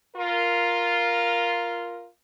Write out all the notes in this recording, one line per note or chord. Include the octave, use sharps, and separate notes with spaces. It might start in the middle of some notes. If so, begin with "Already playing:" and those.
F4 A#4